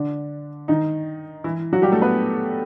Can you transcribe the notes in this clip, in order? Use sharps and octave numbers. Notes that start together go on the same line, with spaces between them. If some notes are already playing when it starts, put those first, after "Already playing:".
Already playing: D3 D4
D#3 D#4
E3 E4
F#3 F#4
G3 G4
A3 A4
B3 B4